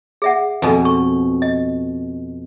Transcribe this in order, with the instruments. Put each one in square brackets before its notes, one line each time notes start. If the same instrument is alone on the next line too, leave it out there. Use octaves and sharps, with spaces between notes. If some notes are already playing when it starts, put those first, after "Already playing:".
[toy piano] G#4 E5 F#5
[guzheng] F2 B2 [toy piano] B4 G#5 A5
[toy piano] C#6
D#5